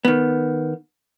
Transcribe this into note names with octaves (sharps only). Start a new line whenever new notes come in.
D#3 B3